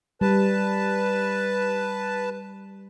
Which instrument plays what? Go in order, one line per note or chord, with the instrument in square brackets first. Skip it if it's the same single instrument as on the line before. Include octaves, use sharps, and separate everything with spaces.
[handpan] G3 [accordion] B4 A5